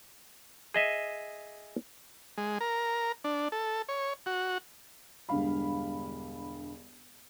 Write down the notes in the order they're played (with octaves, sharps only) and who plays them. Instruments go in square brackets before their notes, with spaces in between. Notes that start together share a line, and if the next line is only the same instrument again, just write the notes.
[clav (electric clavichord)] G#4 D#5 E5
[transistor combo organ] G#3
A#4
D4
A4
C#5
F#4
[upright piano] E1 G2 D3 G3 F5 B5